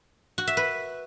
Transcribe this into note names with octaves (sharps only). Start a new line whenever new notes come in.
F#4
E5
B4